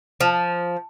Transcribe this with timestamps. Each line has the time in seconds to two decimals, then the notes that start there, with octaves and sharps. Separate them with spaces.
0.21 F3